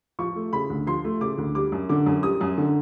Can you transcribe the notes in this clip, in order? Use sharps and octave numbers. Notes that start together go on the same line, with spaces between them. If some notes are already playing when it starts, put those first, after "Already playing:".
F3 C#6
A3
C#3 B5
D2
F3 C6
A3
C#3 D6
D2
G3 D6
F#2
D3 D6
F#2
G3 D#6
F#2
D3